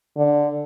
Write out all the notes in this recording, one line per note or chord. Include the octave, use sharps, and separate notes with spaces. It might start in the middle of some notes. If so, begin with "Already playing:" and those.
D3